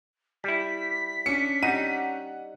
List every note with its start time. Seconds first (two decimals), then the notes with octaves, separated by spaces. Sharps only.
0.44 G3 E4 B6
1.26 C#4 D4 C#7
1.63 G3 D#4 F#5 D#7